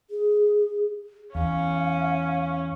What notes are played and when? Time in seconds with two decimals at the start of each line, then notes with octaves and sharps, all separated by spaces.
0.10 G#4
1.35 E2 C#4 F5